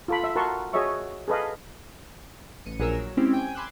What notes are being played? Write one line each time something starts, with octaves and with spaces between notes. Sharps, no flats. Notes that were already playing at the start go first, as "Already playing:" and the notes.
F4 A4 B5
E5
F#4 A#4 F#5 A5 C6 C#6
F#4 G#4 C#5 D#5 E5 C#6
G#4 A4 B4 D#5 F5
A1 C#7 D#7
A#1 F#3 G#4 A#4 E6
F#3
G#3 C4 C#4 E4 G4
G5 G#5 G6
G#5 B5 C6 D6 E6 F#6